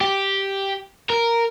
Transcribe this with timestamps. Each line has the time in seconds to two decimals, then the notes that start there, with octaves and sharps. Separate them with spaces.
0.01 G4
1.09 A#4